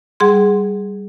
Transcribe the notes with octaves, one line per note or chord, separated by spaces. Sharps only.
G3 G#4 F#5 C6